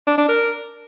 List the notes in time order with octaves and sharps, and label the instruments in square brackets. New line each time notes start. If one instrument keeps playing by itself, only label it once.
[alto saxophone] D4
D4
A#4